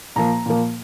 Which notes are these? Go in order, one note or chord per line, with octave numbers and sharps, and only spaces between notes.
A#2 F3 A#3 A#5
A#2 F3 A#3